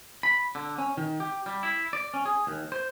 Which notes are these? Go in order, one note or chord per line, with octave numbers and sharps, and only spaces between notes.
B5
D3
C#4
D#3
G4
G3
E4
D5
C#4
G#4
D#2
C5